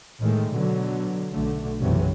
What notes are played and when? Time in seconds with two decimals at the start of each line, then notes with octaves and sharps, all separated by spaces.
0.21 A2 D#3 G#3 A3
0.51 B2 D3 F#3
1.31 B1 D3 A3
1.81 F#1 B1 C3 E3 F#3 C#4